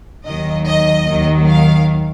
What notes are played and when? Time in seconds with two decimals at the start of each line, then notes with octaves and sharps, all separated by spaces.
0.25 D#2 D#3 F#3 D#5
0.66 D#5
1.08 D#2 D#3 F#3
1.49 F5